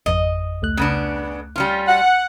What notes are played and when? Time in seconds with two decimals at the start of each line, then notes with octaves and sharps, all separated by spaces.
0.06 G#1 F2 D#5
0.62 C#2 A3 F#6
0.77 C#3 B3 D4
1.56 G3 C#4 F4
1.88 F#5